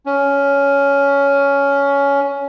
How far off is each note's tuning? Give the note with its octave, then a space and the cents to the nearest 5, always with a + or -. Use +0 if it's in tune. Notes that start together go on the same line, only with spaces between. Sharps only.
C#4 +15